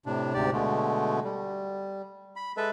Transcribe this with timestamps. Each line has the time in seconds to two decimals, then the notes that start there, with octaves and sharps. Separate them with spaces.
0.06 A2 C3 D4
0.34 D2 G#2 C3 G4 D5
0.53 B2 D3 G#3 A3
1.24 G3
2.36 B5
2.57 G#3 A4 B4 E5